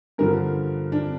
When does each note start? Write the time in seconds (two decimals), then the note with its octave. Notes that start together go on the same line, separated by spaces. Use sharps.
0.18 G2 D3 F3 A#4
0.92 D4